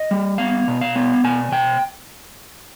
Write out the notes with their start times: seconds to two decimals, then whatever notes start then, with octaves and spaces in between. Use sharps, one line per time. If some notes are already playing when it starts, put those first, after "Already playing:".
Already playing: D#5
0.11 G3
0.38 B3 F5
0.68 B2
0.81 F5
0.95 B3
1.24 B2 G#5
1.52 B2 G5